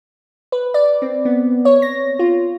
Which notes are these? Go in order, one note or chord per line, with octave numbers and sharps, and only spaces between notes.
B4
D5
C4
B3
C#5
A#6
F4